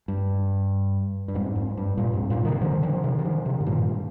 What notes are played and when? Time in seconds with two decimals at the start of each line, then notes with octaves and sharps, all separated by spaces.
0.08 G2
1.28 G2
1.34 F2 G#2
1.56 F2
1.77 G2
1.97 G2 A#2
2.14 F2 G#2
2.30 G2 A#2
2.45 C3 D#3
2.61 D3 F3
2.82 D3 F3
2.95 F3
3.04 C3 D#3
3.19 D#3
3.25 D3 F3
3.45 C3 D#3
3.60 G#2
3.66 G2 A#2